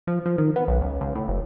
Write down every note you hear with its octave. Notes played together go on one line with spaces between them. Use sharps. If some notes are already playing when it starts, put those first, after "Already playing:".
F3
F3
D#3
B3
B1
C#2
C#2
A2
F#1